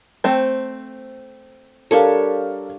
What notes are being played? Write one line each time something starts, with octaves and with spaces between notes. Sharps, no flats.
A3 C4 C5
G3 D4 A4 A#4 C#5 F5